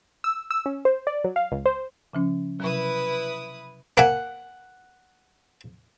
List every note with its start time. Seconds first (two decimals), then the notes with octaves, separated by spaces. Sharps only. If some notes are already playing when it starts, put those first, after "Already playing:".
0.24 E6
0.51 E6
0.66 C#4
0.85 C5
1.07 D5
1.24 F#3
1.36 F5
1.52 C#2
1.66 C5
2.13 C#3 F3 C#4
2.60 C3 F#3 E4 B4 D#6
3.97 A#3 E5 F#5 G#5